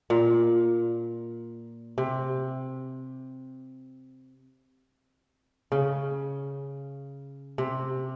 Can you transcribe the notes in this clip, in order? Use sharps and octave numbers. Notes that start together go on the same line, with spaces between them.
A#2
C3
C#3
C3